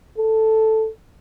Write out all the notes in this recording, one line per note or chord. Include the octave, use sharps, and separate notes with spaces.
A4